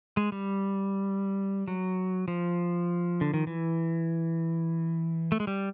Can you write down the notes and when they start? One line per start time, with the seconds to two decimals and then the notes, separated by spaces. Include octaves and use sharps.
0.17 G#3
0.32 G3
1.68 F#3
2.28 F3
3.21 D3
3.34 D#3
3.47 E3
5.32 A3
5.40 G#3
5.47 G3